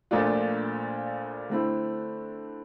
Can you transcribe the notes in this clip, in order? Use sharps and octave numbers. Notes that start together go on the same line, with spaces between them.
A#1 A#2 A3 D4 F4
D3 A3 C4 E4